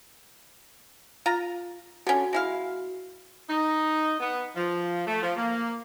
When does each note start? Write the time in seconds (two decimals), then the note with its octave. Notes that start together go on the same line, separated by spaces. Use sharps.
1.26 F4 A#5
2.07 D3 C#4 F#4
2.33 G#3 E4 F5
3.50 D#4
4.20 B3
4.56 F3
5.07 A3
5.22 F3
5.37 A#3